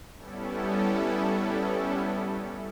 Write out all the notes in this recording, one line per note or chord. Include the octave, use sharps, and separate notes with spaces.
G3 B3 C#4 E4 A4